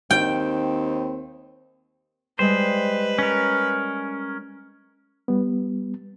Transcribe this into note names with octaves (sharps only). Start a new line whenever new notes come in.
D#2 C4 G5
G3 G#3 B4 C5 D#5
C#4 A#4
G3 B3